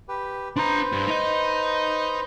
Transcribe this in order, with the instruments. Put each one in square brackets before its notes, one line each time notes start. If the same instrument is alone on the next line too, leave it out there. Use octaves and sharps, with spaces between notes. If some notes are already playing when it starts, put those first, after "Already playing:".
[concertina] G4 B4
[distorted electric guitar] D4 A#5 [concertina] B4 C5
[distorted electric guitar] G2
D#4 D#5